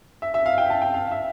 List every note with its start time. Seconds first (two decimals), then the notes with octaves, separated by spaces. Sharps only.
0.22 E5
0.34 E5
0.46 F5
0.58 G5
0.70 A5
0.82 G5
0.94 F5
1.11 E5